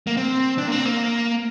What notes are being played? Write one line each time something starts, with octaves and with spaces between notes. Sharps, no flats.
A#3
C4
D4
A#3
C4
A#3